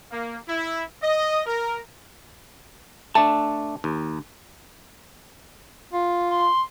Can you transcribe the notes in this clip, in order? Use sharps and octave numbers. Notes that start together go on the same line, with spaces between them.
A#3
E4
D#5
A#4
A3 D4 A5
D#2
F4
C6